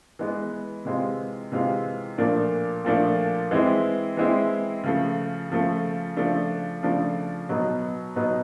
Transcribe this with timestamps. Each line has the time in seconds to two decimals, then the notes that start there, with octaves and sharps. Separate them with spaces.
0.19 E3 G#3 B3
0.85 C3 E3 G#3 C4 F4
1.52 C3 E3 G#3 C4 F4
2.18 A#2 F3 A3 D4
2.85 A#2 F3 A3 D4
3.51 E3 G#3 C4 E4
4.17 E3 G#3 C4 E4
4.84 C#3 F3 A3
5.50 C#3 F3 A3
6.17 C#3 F3 A3 D4
6.83 C#3 F3 A3 D4
7.49 B2 F#3 B3 D#4
8.16 B2 F#3 B3 D#4